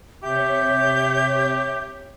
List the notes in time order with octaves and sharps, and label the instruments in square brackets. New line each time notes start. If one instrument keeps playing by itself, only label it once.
[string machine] C3 C#5 [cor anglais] G4 [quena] E5 [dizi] G6